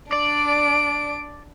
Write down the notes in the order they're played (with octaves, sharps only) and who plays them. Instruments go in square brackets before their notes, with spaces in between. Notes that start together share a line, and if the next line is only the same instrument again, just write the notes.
[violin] D4 D7 [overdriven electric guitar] D5